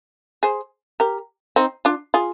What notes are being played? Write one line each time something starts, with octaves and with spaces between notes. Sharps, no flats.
G#4 C5
G4 A#4
C4 D#4
D4 F4
F4 G#4